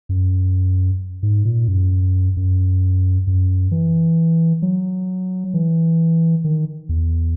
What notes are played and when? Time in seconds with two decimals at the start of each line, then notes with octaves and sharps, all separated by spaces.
0.09 F#2
1.23 G#2
1.45 A#2
1.68 F#2
2.37 F#2
3.27 F#2
3.71 E3
4.62 F#3
5.54 E3
6.44 D#3
6.89 E2